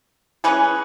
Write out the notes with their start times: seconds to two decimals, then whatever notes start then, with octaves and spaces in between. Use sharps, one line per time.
0.44 E3 G#3 C#4 G#4 B4